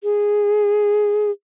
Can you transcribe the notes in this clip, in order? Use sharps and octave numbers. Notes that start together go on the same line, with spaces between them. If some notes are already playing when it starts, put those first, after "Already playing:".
G#4